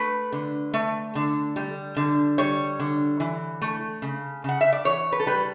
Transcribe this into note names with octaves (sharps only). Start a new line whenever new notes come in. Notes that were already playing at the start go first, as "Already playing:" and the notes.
Already playing: A3 B4
D3
A3
D3
G3
D3
G3 C#5
D3
E3
A3
C#3
C#3 F#5
E5
D5
E3 C#5
B4
A4
G3 B4